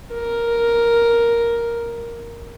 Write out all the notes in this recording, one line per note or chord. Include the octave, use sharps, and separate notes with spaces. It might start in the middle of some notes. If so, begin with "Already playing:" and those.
A#4